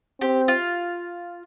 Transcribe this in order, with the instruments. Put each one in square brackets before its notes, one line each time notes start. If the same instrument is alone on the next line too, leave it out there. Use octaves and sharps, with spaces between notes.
[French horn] C4 [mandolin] G4
[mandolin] F4